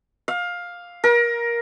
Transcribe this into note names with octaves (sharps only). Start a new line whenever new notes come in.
F5
A#4